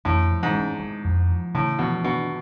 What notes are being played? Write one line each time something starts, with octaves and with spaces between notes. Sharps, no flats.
F2 A2
F3
G#2
C#4
G#3
F2
F3
A2 C#3
B2 F3
B2 D4